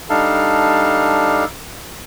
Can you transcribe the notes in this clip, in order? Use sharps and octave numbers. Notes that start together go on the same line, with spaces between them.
G3 D4 D#4 A4 F5